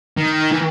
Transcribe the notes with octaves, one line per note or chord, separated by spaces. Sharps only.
D#3
E3